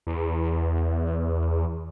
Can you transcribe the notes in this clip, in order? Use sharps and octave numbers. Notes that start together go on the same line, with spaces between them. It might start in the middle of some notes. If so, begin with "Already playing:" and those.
E2